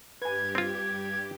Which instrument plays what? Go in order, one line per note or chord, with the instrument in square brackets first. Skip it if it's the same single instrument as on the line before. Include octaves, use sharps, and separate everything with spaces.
[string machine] G2 G4 [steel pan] B4 G#5 [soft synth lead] G#6
[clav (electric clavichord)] C4 F4